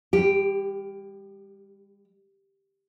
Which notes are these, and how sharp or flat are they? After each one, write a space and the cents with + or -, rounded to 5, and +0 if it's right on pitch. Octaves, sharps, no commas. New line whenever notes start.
G3 +45 G4 +0